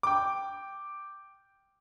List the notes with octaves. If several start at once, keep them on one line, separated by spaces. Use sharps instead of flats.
G5 D6